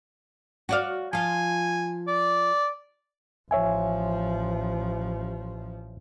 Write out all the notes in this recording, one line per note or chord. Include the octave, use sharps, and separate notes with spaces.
F#4 D5 F5
F3 F4 G#5
D5
A1 F3 C#5 E5 G#5